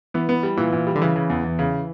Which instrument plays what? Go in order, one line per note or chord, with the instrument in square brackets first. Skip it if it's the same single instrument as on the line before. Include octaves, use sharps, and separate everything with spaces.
[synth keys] E3 [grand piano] B3
[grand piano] B3
G3
[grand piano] A#2 [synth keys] E3
[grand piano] A#2
G3
[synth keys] D3
[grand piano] C#3 [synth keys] E3
[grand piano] C#3
E2
E2
C#3